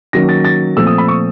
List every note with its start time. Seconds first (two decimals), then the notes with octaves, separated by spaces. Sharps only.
0.13 D#3 F#3 A#3 C#4 A#6
0.29 A6
0.45 A6
0.76 A#2 F3 A3 C4 E6
0.87 D#6
0.98 B5
1.08 C#6